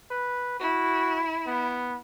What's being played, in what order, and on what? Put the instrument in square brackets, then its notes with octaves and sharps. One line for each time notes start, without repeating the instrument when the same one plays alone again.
[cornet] B4
[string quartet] E4 [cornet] F#4
[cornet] B3